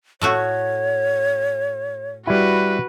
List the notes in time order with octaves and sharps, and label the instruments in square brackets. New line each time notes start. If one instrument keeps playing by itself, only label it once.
[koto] A2 A3 F#4 [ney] C#5
[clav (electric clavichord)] G3 E4 [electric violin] F#4 B4